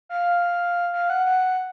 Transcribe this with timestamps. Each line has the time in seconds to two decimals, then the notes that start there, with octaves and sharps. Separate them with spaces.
0.09 F5
0.93 F5
1.10 F#5
1.26 F#5